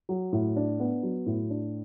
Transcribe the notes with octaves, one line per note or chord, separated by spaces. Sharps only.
F#3
A2
D4
B3
F#3
A2
D4